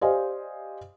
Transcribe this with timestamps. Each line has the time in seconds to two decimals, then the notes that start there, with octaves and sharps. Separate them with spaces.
0.01 G4 C5 D5 D#5 F5 G#5